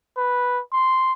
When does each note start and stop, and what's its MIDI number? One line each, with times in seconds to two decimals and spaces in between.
0.17 0.61 71
0.73 1.13 84